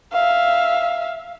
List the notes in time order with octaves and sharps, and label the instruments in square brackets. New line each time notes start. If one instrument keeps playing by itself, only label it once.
[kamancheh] E5 F5